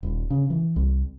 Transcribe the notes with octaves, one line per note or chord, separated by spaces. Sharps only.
D#1
C#3
E3
C2